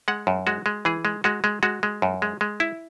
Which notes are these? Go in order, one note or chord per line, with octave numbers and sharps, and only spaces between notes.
G#3 F#5
F#2
G#3 F#4
G#3
E3 G#4
G#3
G#3 F#4
G#3
G#3 F#4
G#3
F#2
G#3
G#3
E4